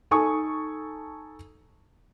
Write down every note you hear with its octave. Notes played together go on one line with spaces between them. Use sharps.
D#4 A4 G#5 C#6 D#6